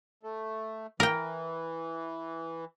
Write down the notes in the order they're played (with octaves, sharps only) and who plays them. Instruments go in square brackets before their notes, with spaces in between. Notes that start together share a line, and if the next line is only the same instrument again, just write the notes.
[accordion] A3
[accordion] E3 [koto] A#4 G5